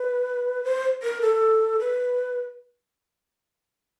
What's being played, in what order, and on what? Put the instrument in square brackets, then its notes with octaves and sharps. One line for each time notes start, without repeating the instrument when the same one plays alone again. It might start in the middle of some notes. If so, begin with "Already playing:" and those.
Already playing: [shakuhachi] B4
C5
A#4
A4
B4